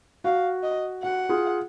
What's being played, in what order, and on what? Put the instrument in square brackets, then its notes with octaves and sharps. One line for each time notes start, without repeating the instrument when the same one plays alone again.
[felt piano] F#4 [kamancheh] F5
[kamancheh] D#5
[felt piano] F#4 [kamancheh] F#5
[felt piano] F4 G#4